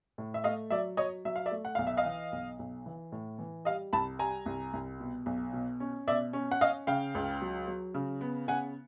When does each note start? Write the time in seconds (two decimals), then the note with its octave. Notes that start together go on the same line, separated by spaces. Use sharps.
0.18 A2
0.34 E5
0.44 A3 D#5 F5
0.70 F#3 D5 E5
0.97 F#3 C#5 D#5
1.25 F#3 E5
1.36 F5
1.46 D5 E5
1.51 A3
1.65 F#5
1.75 B1 F5
1.87 E5
1.97 D#5 F5
2.05 E3
2.32 B1
2.59 B1
2.86 E3
3.12 A2
3.39 E3
3.65 G3 D#5 F5
3.93 C2 A5 B5
4.19 G3 G#5 A#5
4.46 C2
4.73 C2
5.00 B2
5.26 B1
5.53 B2
5.80 C#4
6.07 B2 D5 E5
6.33 C#4
6.51 F#5
6.61 C#4 D#5 F5
6.87 C#3 F5 G5
7.15 C#2
7.42 F#3
7.68 F#3
7.94 C#3
8.21 B3
8.48 C#3 F#5 G#5